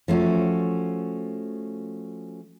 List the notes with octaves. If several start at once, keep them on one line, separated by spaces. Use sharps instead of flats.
F3 A3 C#4 F#4